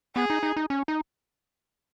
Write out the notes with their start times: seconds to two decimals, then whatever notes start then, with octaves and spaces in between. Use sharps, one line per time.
0.15 B3 G#4
0.30 D#4
0.43 D#4
0.57 D#4
0.70 C#4
0.88 D#4